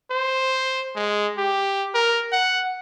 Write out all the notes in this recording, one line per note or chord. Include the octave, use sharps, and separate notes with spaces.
C5
G#3
G4
A#4
F#5